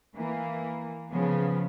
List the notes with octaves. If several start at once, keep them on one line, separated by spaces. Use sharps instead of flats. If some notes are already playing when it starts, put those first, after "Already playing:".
E3 A#3
C#3 F3 B3